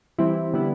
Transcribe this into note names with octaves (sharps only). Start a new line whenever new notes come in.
E3 G3 C4 E4
D3 G3 B3 E4